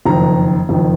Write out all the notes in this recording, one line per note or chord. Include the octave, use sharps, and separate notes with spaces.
F#1 F2 D#3 A#5
F#1 F2 D#3